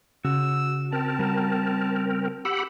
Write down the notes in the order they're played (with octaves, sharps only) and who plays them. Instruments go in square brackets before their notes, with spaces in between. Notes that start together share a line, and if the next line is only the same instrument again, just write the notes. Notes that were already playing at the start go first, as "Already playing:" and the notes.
[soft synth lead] C#3 [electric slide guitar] F#4 [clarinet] E6
[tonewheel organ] C4 A#4 [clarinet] A5
[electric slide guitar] G3 F#4 A#5
[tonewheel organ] G4 F#5 B5 [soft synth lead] E6